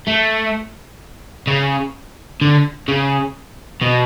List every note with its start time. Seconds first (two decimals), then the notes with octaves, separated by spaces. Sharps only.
0.08 A3
1.47 C#3
2.41 D3
2.88 C#3
3.81 B2